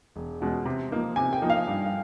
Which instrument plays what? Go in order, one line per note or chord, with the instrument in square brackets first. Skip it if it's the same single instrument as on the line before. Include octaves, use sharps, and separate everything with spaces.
[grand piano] E1
E2 B2 G#3 C#4
C3
F3 A#3 D#4
[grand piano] C3 [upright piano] G#5
[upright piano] G5
[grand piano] F3 A#3 D#4
[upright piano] F5
[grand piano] G2